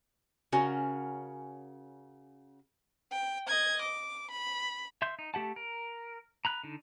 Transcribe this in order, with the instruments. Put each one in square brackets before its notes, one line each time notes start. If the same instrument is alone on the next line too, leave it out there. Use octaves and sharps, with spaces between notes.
[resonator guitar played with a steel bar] C#3 C#4 F#4 A#4
[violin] G5
D#5 G#6
D6
B5
[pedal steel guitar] E5 C6 G6
D#4
A3 G4 F#5 A5
A#4
A#5 B5 F#6
D3 D#4